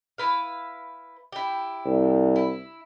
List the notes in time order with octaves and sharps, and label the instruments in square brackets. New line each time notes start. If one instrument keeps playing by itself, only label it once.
[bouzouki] E4 B4 F5
E4 G4
[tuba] C2
[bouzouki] E4